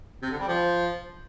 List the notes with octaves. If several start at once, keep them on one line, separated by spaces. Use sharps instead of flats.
C3
D3
G3
F3